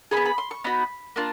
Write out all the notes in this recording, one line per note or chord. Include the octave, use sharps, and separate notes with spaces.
D#4 G#4 B5
B3
B5
C6
C#6
B3 D#4 F#4 B5
A#3 D4 F4